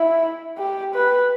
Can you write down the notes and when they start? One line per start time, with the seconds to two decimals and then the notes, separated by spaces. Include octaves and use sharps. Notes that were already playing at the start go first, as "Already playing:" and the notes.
Already playing: E4
0.58 G4
0.94 B4